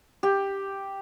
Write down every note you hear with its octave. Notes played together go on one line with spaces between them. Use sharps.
G4